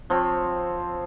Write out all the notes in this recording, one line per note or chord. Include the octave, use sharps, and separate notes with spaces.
F3 C4 C#5